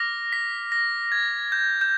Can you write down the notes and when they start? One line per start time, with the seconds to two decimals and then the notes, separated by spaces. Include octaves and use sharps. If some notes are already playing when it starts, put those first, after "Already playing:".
Already playing: D6 F6 A#6
0.32 B6
0.72 A#6
1.12 G#6
1.52 G6
1.81 G6